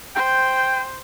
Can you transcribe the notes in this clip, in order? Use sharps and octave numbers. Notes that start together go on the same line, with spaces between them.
C5 G5